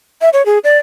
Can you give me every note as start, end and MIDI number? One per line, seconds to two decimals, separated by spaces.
0.22 0.29 76
0.33 0.45 73
0.46 0.59 68
0.64 0.78 74